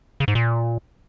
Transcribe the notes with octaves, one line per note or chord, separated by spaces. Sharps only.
C#3
G#2
A#2